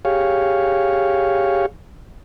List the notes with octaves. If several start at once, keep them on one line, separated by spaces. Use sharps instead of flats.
G4 G#4 C#5 F5